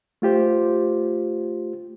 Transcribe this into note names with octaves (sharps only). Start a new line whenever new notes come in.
A3 F4 G4 C5